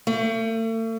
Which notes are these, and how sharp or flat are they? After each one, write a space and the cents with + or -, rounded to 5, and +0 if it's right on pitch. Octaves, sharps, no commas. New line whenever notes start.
A3 +40